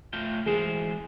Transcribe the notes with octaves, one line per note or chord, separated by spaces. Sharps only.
A3 F4 G5
E3 G#3 G#4 C5